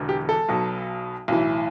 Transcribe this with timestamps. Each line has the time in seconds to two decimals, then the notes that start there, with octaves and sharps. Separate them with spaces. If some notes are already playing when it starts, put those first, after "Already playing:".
Already playing: E1 E2 D3
0.09 G4
0.29 A4
0.49 B1 B2 F#3
1.28 B1 A2 E3